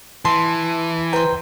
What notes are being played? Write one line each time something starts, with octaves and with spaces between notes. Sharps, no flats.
E3 A5 C6
B4 C5 G5 A#5